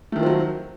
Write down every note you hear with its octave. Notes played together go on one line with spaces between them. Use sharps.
D#3 F3 F#3 A3 C4